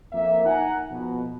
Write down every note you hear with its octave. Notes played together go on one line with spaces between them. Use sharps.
F2 A#3 E5
D#4 F#5 G#5 A#5
F2 B2